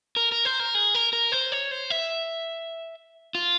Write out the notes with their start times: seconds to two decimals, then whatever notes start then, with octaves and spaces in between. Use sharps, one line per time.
0.16 A#4
0.32 A#4
0.45 C5
0.60 A#4
0.75 G#4
0.95 A#4
1.13 A#4
1.32 C5
1.52 C#5
1.71 C5
1.90 E5
3.35 F4